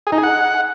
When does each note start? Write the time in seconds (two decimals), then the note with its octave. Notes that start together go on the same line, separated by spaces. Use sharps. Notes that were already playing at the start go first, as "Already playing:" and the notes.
0.07 G#4
0.12 D#4
0.18 G#4
0.24 F#5